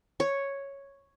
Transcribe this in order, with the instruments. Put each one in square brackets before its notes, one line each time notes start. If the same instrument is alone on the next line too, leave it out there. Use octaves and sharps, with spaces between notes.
[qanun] C#5